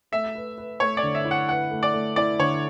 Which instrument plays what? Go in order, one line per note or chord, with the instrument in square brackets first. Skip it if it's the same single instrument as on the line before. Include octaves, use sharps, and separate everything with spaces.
[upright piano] A3 [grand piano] E5
[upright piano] B4
B4
[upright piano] A3 [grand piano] C#5
[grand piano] D5
[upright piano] D3
[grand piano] E5
[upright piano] E4
[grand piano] F#5
[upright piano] B4 [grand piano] F#5
[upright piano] A3
[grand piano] D5
[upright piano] A3
[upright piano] E4 [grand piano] D5
[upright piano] D3 [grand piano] C#5